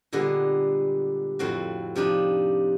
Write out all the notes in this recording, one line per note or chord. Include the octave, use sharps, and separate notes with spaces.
A#2 D3 G3 G#3 B3
F2 A2 C4 F#4
C3 F3 D4 D#4